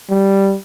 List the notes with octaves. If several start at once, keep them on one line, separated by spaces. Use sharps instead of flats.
G3